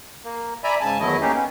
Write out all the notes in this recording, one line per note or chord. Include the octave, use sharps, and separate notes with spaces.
A#3
D5 E5 G#5 A#5 B5
G#2 C#3 G#5 A5
E2 D#3 F#3 A3 E4 D#5
A3 A#3 C#4 D#4 G4 G#4
B3 C#4